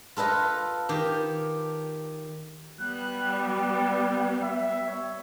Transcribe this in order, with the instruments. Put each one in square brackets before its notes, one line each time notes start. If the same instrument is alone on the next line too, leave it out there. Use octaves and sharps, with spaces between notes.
[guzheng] F4 A4 B4 D#5
D#3 G4
[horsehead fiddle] G3 B3 [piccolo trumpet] F#6
[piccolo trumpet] D5
E5
C#5